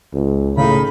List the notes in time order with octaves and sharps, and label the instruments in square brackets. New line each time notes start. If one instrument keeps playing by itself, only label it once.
[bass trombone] C#2
[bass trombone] A2 [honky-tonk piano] C#3 [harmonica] D#4 B5